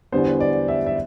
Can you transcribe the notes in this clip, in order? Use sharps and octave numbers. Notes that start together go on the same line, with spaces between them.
E2 D3 G3 B3 C5
D5
E5
E5